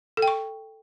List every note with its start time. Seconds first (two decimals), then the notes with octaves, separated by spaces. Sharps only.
0.17 A4
0.22 G5
0.28 C#6